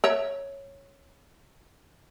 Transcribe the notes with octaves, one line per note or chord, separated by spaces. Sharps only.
A#4 C#5 E5